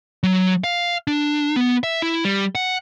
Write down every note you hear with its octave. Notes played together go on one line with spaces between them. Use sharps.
F#3
F5
D4
B3
E5
E4
G3
F#5